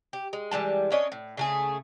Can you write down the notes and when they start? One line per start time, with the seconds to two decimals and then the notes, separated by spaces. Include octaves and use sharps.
0.13 G4
0.33 G#3
0.51 E3 G3 G#3 A5
0.92 C#4 D4 C#5 D#5
1.12 A2
1.37 C#3 A3 G#4